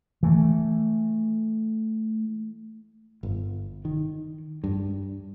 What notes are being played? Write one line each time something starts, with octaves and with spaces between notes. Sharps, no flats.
E3 A3
G1
D#3
G2